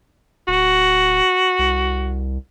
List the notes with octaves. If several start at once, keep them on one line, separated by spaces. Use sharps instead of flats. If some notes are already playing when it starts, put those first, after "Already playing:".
D1 F#4
C2